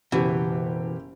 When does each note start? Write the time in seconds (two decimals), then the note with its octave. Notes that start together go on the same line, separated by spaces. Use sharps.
0.12 F#1 B2 E3 G4